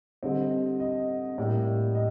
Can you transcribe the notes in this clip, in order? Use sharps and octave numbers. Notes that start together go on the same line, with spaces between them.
D3 G3 C4 D#5
D#5
A2 G3 A#3 D5
D#5